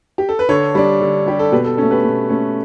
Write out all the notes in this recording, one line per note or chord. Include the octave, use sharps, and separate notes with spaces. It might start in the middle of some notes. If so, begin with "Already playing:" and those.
G4
A4
B4
D3 A4 C#5
G3 D4
D3
G3 D4 G4
A4
B2 G4 B4
A4
A3 C#4 A4
G4 B4
B2
A3 C#4